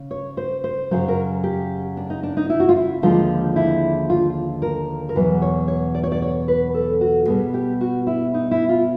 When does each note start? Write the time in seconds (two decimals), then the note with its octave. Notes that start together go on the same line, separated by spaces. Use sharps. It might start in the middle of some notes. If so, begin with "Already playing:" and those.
Already playing: C#3
0.11 C#5
0.37 C5
0.64 C5
0.91 F#2 C#3 F#3 C5
1.08 A#4
1.44 G4
1.97 D4
2.10 D#4
2.23 D4
2.37 D#4
2.50 E4
2.60 F#4
2.69 F4
2.76 E4
3.02 D#2 D3 F3 G#3 F4
3.56 E4
4.10 F4
4.62 A#4
5.09 A#4
5.15 E2 B2 F#3 B4
5.42 C#5
5.68 C#5
5.95 D5
6.03 C#5
6.12 D5
6.22 C#5
6.48 B4
6.74 A4
7.01 F#4
7.27 B2 G3 B3 G#4
7.54 G4
7.81 F#4
8.07 E4
8.34 D#4
8.51 E4
8.69 F4